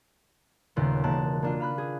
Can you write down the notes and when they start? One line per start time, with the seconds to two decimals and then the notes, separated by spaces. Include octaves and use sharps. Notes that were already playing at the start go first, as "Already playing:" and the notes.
0.76 D#1 D#2 C#3 B3 C6
1.04 E1 A#3 A5 F#6
1.42 A#3 D4 F4
1.60 F5 B5 F#6
1.78 G#4